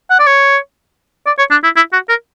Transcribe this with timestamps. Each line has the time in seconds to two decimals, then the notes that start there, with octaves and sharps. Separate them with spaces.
0.10 F#5
0.19 D5
0.27 C#5
1.26 D5
1.38 C#5
1.51 D4
1.63 E4
1.76 E4
1.93 F#4
2.09 A#4